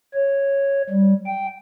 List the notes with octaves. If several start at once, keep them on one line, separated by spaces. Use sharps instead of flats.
C#5
G3
G5